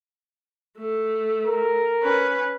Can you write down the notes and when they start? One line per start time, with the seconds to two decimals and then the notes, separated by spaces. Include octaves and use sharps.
0.78 A3
1.45 A#4
2.02 C#4 B4